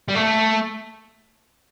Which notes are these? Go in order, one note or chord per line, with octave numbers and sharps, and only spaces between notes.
G3
A3